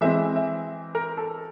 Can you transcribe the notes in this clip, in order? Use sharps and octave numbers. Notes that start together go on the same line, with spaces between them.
E3 G#3 C4 E5
E5
A#4
A4